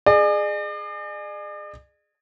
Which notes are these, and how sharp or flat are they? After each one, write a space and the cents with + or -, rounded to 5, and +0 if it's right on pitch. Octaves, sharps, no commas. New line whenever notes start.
G#4 +5 D5 +45